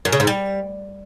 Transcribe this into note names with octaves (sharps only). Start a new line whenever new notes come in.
F#2
C#3
G#2
G3